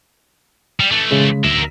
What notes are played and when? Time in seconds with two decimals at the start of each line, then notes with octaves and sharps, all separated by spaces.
0.80 G3
0.91 E3 A3
1.11 C#3 G#3
1.44 D2 A#4 E5